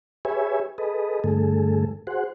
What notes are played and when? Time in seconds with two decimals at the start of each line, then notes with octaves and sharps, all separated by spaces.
0.25 G4 G#4 B4 C#5 E5 G#5
0.78 G#4 A4 B4 D#5
1.24 G2 D3 A3 G#4 A4
2.07 F#4 G#4 C5 F#5